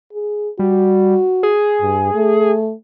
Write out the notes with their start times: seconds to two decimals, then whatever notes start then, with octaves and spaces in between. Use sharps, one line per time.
0.13 G#4
0.59 G3 F#4
1.43 G#4
1.81 G2
2.15 A3